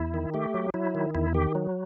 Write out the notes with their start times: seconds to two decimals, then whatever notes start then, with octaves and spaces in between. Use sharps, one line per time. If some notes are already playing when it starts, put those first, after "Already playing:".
Already playing: E2 E4
0.14 D#3
0.34 A3 G4
0.54 F#3
0.74 F#3 E4
0.95 D#3
1.15 E2 E4
1.34 D#3 G4
1.55 F#3